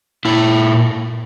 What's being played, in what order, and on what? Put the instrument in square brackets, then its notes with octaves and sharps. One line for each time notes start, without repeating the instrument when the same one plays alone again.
[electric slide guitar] A#2 E4